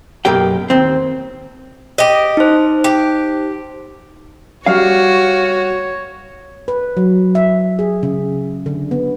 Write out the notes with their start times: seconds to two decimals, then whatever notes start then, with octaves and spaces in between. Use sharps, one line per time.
0.25 B1 F#2 A#3 G4 G5
0.70 D#2 C4
1.98 G4 D#5
2.37 D#4 C5
2.84 G4
4.66 G3 F#4 C#5 F5 F6
6.68 B4
6.97 F#3
7.35 E5
7.79 G#4
8.03 C#3
8.66 D3
8.91 B3